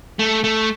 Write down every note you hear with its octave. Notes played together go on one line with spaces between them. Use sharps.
A3
A3